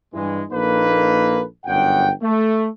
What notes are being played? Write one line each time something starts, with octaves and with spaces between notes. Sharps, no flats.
G2 E3 G#3
A#1 A#3 D#4 A4 B4
G1 F#2 F#5 G5
A3